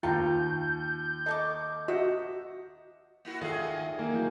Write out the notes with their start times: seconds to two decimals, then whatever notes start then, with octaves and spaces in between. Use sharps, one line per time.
0.03 D#2 F4 G5 A5 A#5 G6
1.26 A4 D#5 C#6 D6
1.88 F#4 D#5 E5
3.25 A#3 E4 F#4
3.41 D#3 F4 G#4 A4 D5 E5 F5
3.99 D#3 A#3
4.13 E3 F#3 G6